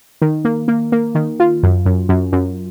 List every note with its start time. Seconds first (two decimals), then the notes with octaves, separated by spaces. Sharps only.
0.21 D#3
0.45 A#3
0.68 A#3
0.92 A#3
1.15 D#3
1.40 F4
1.63 F#2
1.86 F#2
2.09 F#2
2.32 F#2